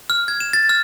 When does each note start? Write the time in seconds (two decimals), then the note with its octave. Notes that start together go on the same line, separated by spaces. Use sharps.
0.10 F6
0.28 G#6
0.40 E7
0.53 A6
0.69 F6